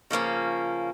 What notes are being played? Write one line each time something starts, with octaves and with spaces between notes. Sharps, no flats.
C#3 F3 A#3 C#4